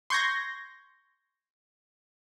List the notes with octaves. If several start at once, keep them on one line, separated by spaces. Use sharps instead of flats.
C6 C#6 G6 G#6 A#6